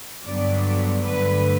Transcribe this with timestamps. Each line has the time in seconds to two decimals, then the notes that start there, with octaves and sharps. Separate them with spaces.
0.24 G2 D3 F#3 B3 D4 D5
1.04 G2 D3 A3 B4